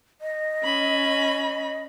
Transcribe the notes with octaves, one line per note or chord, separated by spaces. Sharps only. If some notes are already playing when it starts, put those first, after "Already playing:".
D#5
C#4 B5